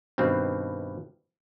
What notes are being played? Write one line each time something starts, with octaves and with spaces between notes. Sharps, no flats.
G2 B2 D#3 C4